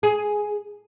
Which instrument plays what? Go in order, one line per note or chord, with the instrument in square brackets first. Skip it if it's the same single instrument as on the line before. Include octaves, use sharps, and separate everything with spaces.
[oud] G#4